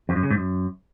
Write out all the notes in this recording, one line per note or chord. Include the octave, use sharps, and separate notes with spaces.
F2
F#2
C#3
G#2
F#2